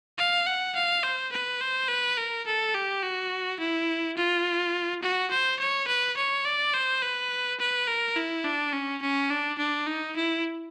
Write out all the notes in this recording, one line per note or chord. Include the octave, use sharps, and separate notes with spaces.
F5
F#5
F5
C5
B4
C5
B4
A#4
A4
G4
F#4
E4
F4
F#4
C5
C#5
B4
C#5
D5
C5
B4
B4
A#4
E4
D4
C#4
C#4
D4
D4
D#4
E4